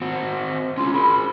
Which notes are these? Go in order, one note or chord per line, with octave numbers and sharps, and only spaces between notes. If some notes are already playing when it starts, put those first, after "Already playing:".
C4 F#4
C#4 F4 C6
G#4 A#4 B5